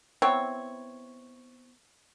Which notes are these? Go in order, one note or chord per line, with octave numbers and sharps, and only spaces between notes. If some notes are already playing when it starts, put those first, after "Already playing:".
B3 C4 E4 C#5